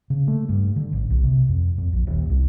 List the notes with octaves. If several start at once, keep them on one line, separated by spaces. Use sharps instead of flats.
C#3
A3
G2
D3
A1
B1
C3
F2
F2
A#1
D#1
C2